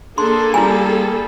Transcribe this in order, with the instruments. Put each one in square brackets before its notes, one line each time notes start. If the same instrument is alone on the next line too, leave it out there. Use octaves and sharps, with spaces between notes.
[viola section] A#3 G#4 A4 [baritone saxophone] D4 [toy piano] C6
[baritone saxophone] G3 [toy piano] E4 G#5